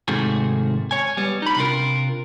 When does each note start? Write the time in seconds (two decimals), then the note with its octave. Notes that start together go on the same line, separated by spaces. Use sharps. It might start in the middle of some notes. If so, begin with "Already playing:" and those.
0.08 G#2 C3 D#3 A3 F#4 G#4
0.91 C#5 G#5
1.17 G3 B3
1.42 D#4 B5
1.56 C3 D4 F4 A#4